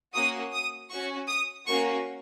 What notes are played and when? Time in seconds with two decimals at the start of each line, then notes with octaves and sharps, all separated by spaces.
0.14 A#3 C#4 F#4 D#6
0.53 D#6
0.91 C#4 F#4 C#6
1.28 D#6
1.66 A#3 C#4 F#4 C#6